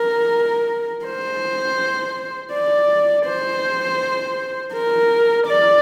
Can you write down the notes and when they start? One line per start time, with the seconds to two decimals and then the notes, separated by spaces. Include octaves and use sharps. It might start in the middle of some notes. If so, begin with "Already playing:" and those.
Already playing: A#4
1.05 C5
2.53 D5
3.26 C5
4.74 A#4
5.48 D5